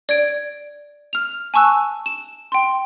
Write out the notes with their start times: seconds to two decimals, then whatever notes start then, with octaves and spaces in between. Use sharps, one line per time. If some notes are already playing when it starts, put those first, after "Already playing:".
0.09 D5 G#6 D7
1.13 F6 F7
1.54 G#5 A5 C#6 E6 F#6
2.06 E7
2.52 G5 C6